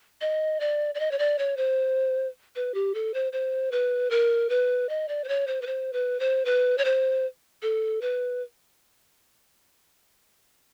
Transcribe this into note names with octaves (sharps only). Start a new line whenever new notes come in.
D#5
D5
D5
D#5
C#5
D5
C#5
C5
B4
G4
A4
C5
C5
B4
A#4
B4
D#5
D5
C5
C#5
C5
B4
C5
B4
C5
B4
C#5
C5
A4
B4